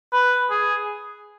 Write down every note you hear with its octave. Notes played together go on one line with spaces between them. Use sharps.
B4
G#4